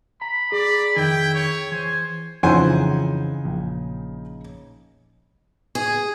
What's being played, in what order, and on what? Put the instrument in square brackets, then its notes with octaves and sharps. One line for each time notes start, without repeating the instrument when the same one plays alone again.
[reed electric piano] A#5 [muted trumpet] B5
[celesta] G#4 [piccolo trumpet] D5
[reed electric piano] F2 D#3 [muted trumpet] E4 [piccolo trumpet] G5
[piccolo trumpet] C#5
[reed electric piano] E3 [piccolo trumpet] C5 [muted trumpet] G#5
[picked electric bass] F2 E3 F3 [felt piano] C#3 D#4 [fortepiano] C5 F#5 G#5
[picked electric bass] A#1
[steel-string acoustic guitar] G#4